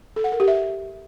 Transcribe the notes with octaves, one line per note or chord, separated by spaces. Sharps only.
A4
F#5
A#4
G4
E5